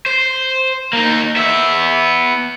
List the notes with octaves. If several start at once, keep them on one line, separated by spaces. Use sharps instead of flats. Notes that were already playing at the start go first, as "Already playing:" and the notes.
C5
A#3 D#4
B3 E5